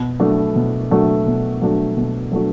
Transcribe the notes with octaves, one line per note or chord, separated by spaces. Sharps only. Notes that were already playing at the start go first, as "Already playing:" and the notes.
Already playing: B2
F#3 A3 D4 F#4
B2
F#3 A3 D4 F#4
B2
F#3 A3 D4 F#4
B2
F#3 A3 D4 F#4